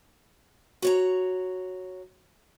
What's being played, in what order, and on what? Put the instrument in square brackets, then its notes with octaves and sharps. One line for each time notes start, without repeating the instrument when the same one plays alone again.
[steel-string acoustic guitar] F#4 C#5 A#5